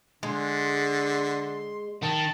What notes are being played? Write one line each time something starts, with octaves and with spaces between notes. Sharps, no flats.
D3 G#3 C6
D#3 A5